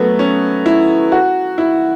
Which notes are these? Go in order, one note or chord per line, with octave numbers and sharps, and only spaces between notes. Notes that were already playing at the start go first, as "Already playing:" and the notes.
Already playing: F#3 A3 B3
C#4
E4
F#4
E4